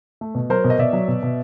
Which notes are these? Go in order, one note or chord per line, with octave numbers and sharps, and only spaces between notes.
A3
B2
F#3 A#4 C5
B2
D#5
B2 D5 E5
F#3
B2
B2